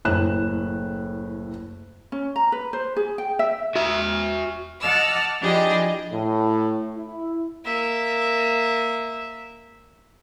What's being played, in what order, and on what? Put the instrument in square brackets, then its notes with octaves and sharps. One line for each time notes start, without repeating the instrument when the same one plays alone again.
[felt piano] F#1 A2 F#6 E7
[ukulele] C#4
A#5
B4
C5
G#4
G5
E5
[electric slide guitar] F#4 E5
[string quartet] D#5 F#5 A5 D6 E6 F6
F3 D4 E4 G4 G#4 D#5
[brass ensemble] A2
E4
[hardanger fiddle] A#3 E5